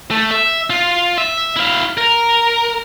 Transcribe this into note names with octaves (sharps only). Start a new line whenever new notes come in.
A3
E5
F4
E5
E4 F5
A#4